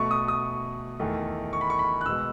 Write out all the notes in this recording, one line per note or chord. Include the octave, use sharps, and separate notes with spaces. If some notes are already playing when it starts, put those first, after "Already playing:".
Already playing: B2 A3 C#6
D#6
D#6
E2 D#3 A3
C#6
B5
C#6
B5
F#6
B2 G#3 B3 E6